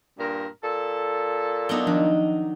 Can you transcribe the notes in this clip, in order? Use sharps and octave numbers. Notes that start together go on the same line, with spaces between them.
G2 A#2 A#4
A#2 A4
F#3 B3 D4 D#4 E6 G7
D#3 F3 D4